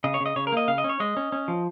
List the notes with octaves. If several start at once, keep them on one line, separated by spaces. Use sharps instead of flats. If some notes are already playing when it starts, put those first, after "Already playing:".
C#3 D#5
C#5
C#3
D#5
C#3 C#5
A#4
A#3 D#5
C#3 F5
D#5
C#4
C#5
G#3 D#5
C#4
C#4
F3